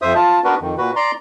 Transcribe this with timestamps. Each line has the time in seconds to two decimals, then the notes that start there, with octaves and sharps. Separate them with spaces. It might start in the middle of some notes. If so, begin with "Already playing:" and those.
0.02 F2 C5 E5 D#6
0.15 F4 A5
0.44 B3 D4 F#4 A#4 B4
0.61 F2 D#3
0.78 A#2 F#4 B4
0.96 D5 A#5 C6